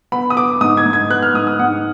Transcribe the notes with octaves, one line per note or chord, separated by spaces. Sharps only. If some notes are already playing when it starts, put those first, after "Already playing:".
B3 B5
D#6
B3 D6
G#2 D#6
G#6
G#2
G#6
B3 F#6
F6
G#2 D#6
D#6
G#2 F#5